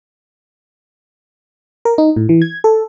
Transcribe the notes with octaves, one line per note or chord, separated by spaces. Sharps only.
A#4
D#4
A2
E3
G#6
A4